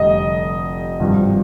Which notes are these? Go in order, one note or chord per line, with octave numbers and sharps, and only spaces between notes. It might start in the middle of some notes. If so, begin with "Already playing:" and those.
Already playing: F1 F2 D3 G3 D#5
G#1 G2 F3